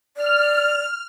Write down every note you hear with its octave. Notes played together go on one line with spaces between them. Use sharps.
D5 F6